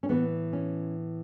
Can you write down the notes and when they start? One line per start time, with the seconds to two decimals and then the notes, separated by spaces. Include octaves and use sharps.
0.03 C#4
0.09 A2 E3 B3
0.53 C#4